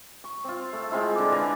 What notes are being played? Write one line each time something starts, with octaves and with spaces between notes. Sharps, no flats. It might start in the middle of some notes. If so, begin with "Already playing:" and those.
C#6
C4 F4
A3 A4
G#3 C4 E4 F4
D3 D6
B4 D5 G#5 A#5